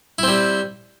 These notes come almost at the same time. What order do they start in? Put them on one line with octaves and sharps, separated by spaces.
E4 C4 G3